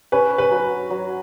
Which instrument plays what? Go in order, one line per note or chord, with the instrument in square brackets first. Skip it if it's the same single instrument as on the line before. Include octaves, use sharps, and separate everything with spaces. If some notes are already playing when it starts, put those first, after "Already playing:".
[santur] C#4 [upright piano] B4
[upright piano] B4
[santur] F#3
F#3